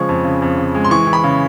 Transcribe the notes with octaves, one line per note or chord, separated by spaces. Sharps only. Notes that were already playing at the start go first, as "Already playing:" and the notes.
Already playing: C#3 F3 G#3 C#6
F2
C#3
F2
C#3
G#3
C6
E3 C#6
E3
B5
C#3